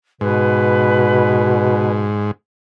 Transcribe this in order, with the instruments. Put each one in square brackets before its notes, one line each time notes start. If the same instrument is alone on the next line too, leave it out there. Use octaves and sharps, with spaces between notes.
[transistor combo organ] G#2 [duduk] B2 [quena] B4